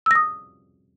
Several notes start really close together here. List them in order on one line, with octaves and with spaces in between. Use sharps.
E6 A#6 D#6